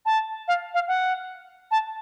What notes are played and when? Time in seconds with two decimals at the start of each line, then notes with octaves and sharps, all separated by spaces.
0.06 A5
0.48 F5
0.74 F5
0.88 F#5
1.71 A5